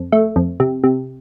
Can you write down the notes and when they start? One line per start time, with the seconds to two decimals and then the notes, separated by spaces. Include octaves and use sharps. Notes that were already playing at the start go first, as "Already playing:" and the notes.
Already playing: F2
0.12 A3
0.36 F2
0.60 C3
0.84 C3